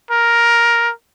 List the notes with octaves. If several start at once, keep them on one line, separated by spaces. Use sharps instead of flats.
A#4